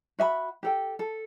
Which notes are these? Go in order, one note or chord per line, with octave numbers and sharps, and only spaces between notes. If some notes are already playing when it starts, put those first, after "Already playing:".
F#4 E5 G#5 B5
G4 A4 G5
A4